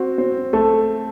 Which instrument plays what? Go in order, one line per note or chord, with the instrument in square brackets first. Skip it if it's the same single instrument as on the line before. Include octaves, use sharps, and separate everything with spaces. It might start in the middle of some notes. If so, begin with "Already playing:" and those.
Already playing: [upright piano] C4 [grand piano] F#4
[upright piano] C4
[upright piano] A3 [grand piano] A4